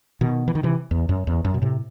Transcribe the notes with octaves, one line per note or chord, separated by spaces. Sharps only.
B2 D#3
E3
D#3
C3 E3
E2
F#2
E2
F#2
B2
A2 C3